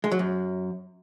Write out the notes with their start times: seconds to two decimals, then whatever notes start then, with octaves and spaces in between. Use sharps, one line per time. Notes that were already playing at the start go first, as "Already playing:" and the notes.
0.04 G#3
0.12 F#3
0.19 F#2